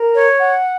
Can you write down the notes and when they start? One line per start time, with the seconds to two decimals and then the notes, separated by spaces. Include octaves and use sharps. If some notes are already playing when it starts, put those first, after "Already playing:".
Already playing: A#4
0.14 C#5
0.39 F#5